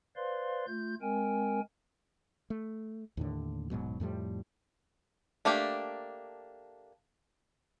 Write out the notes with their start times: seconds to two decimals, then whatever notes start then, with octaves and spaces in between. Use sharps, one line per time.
0.16 B4 C5 D5 F5 C6
0.68 A3 F4 G6
1.01 G#3 C4 A#4 G5 G#5
2.50 A3
3.17 D#2 A2 D3
3.70 D#1 G#2 B2 F#3
4.00 F2 A2 F3 G3
5.45 A3 A#3 D4 G4